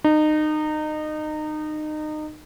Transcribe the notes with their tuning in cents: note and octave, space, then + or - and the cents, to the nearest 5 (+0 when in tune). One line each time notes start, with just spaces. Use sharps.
D#4 -25